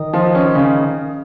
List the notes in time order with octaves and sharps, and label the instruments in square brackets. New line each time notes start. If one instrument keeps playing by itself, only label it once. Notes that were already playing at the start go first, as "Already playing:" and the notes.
Already playing: [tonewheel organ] D#3
[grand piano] F3
C#4
C#3